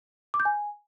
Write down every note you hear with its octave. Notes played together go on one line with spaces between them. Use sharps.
D6
G6
G#5